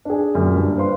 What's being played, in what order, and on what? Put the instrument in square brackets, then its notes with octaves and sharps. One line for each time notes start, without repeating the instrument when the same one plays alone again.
[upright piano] D4 G#4
F#2 A#2
G2
B4 C5 F5 C6